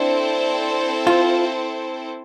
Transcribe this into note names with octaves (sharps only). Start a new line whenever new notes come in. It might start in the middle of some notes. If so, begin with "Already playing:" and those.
Already playing: C4 D4 E4 A4 C5
F4